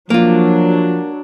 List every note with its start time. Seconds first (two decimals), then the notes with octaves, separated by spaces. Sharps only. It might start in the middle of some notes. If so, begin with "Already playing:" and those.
0.10 F3 F#3 A#3 D4 F4